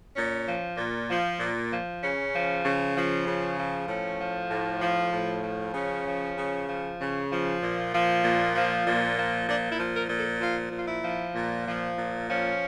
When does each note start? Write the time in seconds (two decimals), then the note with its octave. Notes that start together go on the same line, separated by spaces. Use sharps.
0.15 A#2 C#4
0.47 F3
0.77 A#2
1.08 F3
1.39 A#2
1.70 F3
2.02 C#3 C#4
2.33 F3
2.64 C#3
2.94 F3
3.26 C#3
3.57 F3
3.88 A2 C#4
4.19 F3
4.50 A2
4.82 F3
5.12 A2
5.43 F3
5.74 C#3 C#4
6.05 F3
6.37 C#3
6.67 F3
6.99 C#3
7.30 F3
7.61 A#2
7.92 F3
8.23 A#2
8.55 F3
8.86 A#2
9.16 F3
9.48 A#2 D4
9.70 E4
9.78 F3
9.94 A#4
10.09 A#2
10.18 A4
10.41 F3 F4
10.72 A#2
10.78 F4
10.87 E4
11.02 F3
11.34 A#2
11.66 F3
11.96 A#2
12.27 F3 C#4